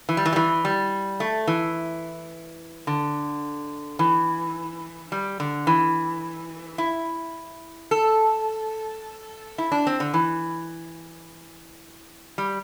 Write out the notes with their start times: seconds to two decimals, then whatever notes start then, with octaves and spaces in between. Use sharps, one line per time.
0.09 E3
0.17 G3
0.26 E3
0.33 G3
0.36 E3
0.65 G3
1.20 A3
1.47 E3
2.87 D3
3.99 E3
5.12 G3
5.40 D3
5.67 E3
6.78 E4
7.91 A4
9.58 E4
9.72 D4
9.87 C4
10.00 D3
10.14 E3
12.38 G3